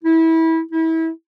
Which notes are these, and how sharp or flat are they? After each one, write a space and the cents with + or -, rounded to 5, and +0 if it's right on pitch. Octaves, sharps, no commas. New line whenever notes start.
E4 -25
E4 -30